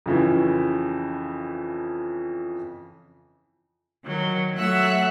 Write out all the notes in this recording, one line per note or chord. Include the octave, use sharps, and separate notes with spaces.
F2 C#3 E3
D#3 F#3
F#3 A3 F#4 E5 E6 F#6